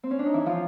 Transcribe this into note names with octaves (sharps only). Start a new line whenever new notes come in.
C4
C#4
D4
D#4
E3 E4
F3 F4